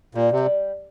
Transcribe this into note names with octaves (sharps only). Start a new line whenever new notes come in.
A#2 G3
C3
G3